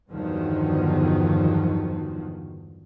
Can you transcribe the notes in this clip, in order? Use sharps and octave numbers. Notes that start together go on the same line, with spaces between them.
E2 G2 D3 D#3 F3 F#3